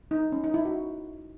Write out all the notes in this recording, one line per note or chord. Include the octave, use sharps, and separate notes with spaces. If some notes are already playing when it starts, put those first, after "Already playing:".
D#4
C#4
D#4
E4
F#4